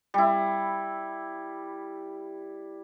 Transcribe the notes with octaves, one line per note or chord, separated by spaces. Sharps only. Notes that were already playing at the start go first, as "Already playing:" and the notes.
G3 E4